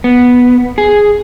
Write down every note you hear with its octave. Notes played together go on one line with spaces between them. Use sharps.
B3
G#4